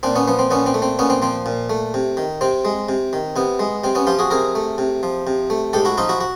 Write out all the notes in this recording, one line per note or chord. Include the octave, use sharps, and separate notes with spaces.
A#2 C4 D4
B3 C#4
F3 B3
C4
A#2 B3 C#4
C4
A3
C4
A#2 B3 C#4
C4
F3 C4
A#2
A3
C3
D#3
C3 C4
G#3
C3
D#3
C3 B3
G#3
C3 C4
B3 C#4
F3 F4 G4
F#4 G#4
C3 G#4 A#4
A3
C3
F3
C3
A3
G#2 G4 A4
E4 F#4
F3 D#4 F4
E4 F#4
F#4